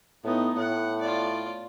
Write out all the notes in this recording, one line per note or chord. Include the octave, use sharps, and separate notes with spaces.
A2 B3 D#4
A2 F#5
F4 D5